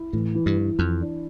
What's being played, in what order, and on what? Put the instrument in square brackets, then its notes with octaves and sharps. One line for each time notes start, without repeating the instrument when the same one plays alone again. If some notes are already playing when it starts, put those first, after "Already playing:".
Already playing: [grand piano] E4
[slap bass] A2 [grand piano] E3
[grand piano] E3
[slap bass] G2
[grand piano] E3
[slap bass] F2 [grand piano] E3
[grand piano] D4